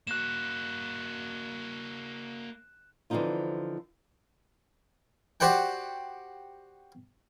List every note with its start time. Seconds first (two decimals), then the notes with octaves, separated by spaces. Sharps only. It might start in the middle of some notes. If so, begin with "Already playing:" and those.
0.07 A#3 F#4 F#6 E7
3.10 D3 E3 F3 C4 D#4 F4
5.40 F#4 G4 C5 D5 F#5 G5